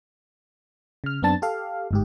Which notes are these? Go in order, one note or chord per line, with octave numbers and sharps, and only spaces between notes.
C#3 F6
F#2 B3 C4 D4 A5 A6
G4 A4 F5
G1 G#2 G4